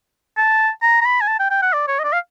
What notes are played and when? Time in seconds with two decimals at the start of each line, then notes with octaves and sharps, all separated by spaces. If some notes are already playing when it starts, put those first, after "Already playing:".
0.37 A5
0.82 A#5
1.01 A#5
1.05 B5
1.21 G#5
1.28 A5
1.40 G5
1.50 G5
1.62 F#5
1.73 D5
1.88 C#5
1.99 D#5
2.04 D5
2.13 F5